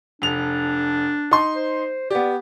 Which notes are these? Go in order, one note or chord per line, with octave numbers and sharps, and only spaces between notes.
F1 D4 F7
D#4 C6
C5
B3 G4 D5